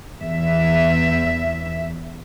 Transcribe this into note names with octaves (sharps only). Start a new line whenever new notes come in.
E2 E5